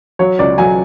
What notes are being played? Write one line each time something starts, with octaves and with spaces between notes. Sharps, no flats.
F#3 C#5
C#2 D5
F#3 G#5